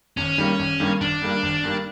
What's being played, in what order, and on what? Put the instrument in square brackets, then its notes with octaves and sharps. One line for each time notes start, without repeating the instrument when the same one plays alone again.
[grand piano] G#1 [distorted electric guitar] C#4
[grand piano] G2 D#3 G3 A#3
G#1
G2 D#3 G3 A#3
[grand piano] G#1 [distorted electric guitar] D4
[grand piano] G2 D#3 G3 A#3
G#1
G2 D#3 G3 A#3